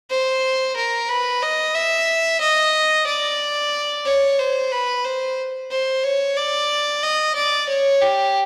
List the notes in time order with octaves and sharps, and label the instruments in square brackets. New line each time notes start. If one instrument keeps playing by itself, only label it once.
[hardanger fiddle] C5
A#4
B4
D#5
E5
D#5
D5
C#5
C5
B4
C5
C5
C#5
D5
D#5
D5
C#5
G4